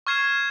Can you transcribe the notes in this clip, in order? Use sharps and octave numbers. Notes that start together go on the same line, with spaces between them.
C#6 F6 G#6 C7 E7